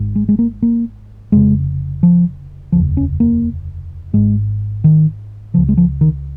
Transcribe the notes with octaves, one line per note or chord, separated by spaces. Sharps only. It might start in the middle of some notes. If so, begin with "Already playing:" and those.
Already playing: G#1 G#2
G#3
G#3
A#3
A#3
F1 F2 C#3 G#3
F3
F1 D#2 C#3 F3
C#4
A#3
G#1 G#2 G#3
D#3
C#2 C#3 F3
G#3
F3
D#3